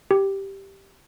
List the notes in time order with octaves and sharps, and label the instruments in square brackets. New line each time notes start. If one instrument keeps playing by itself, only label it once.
[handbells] G4